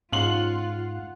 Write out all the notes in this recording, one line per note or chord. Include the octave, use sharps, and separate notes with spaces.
G#2 C#4 F4 F5 F#5 C6 F#7